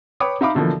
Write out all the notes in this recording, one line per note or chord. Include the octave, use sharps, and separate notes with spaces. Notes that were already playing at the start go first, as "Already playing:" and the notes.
B4 C#5 G5 B5 D6 D#6
D#4 E5 F5 B5 D6
B2 D3 E3 F3 A#3